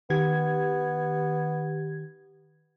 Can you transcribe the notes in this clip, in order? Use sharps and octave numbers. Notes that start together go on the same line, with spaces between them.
D#3 B3 G4 G#6